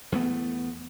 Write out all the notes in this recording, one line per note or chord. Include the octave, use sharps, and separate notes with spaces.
E2 A3 B3